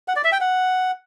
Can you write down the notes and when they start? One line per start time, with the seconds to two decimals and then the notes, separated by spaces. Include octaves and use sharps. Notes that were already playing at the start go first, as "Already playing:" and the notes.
0.08 F#5
0.16 D5
0.24 E5
0.32 G5
0.40 F#5